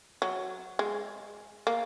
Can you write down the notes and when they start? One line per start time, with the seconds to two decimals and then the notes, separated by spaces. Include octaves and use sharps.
0.22 F#3
0.79 G#3
1.67 A#3